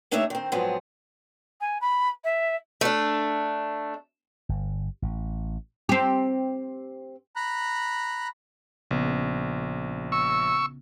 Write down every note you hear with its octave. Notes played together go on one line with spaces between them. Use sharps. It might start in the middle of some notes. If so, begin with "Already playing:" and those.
C3 A3 D4 D#4 C#5 E5
D#3 C4
G#2 F3 F#3 B3 C4 G#4
G#5
B5
E5
A3 D4
G1
A1
C4 G4
A#5 B5 F#6
A#1 C#3 B3
C#6 E6